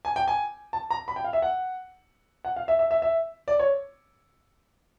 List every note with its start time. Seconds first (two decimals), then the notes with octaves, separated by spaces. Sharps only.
0.05 G#5
0.16 G5
0.28 G#5
0.73 A5
0.90 A#5
1.08 B5
1.16 G5
1.24 F5
1.33 E5
1.42 F#5
2.45 F#5
2.56 F5
2.68 E5
2.79 E5
2.91 E5
3.02 E5
3.48 D5
3.59 C#5